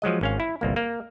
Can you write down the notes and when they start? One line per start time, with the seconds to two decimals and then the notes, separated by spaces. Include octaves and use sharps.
0.02 F3 F#3 G#3 D#5
0.21 G#1 C#4 F5
0.40 E4
0.61 G1 C2 A#3
0.76 A#3